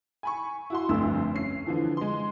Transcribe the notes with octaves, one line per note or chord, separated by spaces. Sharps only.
G#5 B5 C#6
E4 F#4 C6
F1 D2 G2 E6
C#4 C7
D3 E3 F3
G#3 C6